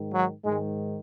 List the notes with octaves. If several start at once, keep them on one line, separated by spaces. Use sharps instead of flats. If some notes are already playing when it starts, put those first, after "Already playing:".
Already playing: G#2 D#3
F#3
G#2 G#3
D#3